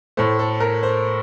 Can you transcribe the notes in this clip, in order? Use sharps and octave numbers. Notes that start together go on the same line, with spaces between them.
A2 A3 C5
A4
A#4
C5